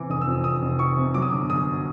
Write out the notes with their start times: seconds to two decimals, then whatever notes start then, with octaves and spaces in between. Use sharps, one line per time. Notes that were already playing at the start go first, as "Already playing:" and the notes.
Already playing: C3 E3 D6
0.09 F1 D#6
0.21 E6
0.27 F2
0.44 F1 D#6
0.62 F1
0.79 E3 C#6
0.97 C3
1.14 F#3 D6
1.22 D#6
1.30 G1 D6
1.50 F#2 D#6